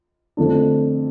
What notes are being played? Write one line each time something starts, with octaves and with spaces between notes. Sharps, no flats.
F2 D3 A3 D4